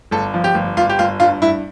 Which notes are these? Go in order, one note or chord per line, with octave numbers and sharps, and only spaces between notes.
G1 A4
F3
G4
G1
G1 F4
G4
G1 F4
G2 F4
G2 E4